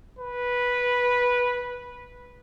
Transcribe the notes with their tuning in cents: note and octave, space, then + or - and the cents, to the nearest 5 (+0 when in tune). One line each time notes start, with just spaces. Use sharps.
B4 -10